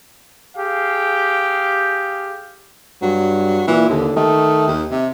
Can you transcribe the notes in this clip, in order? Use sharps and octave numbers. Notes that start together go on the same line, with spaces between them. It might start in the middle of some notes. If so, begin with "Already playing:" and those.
G4 G#4 F5
G2 F#3
A#2 E3
D#2 D3
D#3 A3
D#2
C3